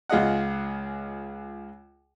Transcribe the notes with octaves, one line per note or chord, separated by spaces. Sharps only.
C#2 F4 G#4 D#5 F#5